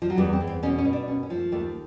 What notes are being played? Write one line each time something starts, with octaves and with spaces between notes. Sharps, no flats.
F3
F#3
E2 G3
C4
E2
C4
B2 C#4
C#4
B2
D4
D#2 C#4
C#4
F3
A3
D#2 A3